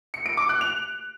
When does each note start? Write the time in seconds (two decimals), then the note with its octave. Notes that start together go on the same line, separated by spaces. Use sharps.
0.14 C#7
0.26 D7
0.37 D6
0.49 F#6
0.61 F7